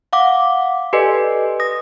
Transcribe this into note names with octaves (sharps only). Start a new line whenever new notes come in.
F5 F#5 D6
G4 A4 B4 D5 D#5 G#5
D#6 A#6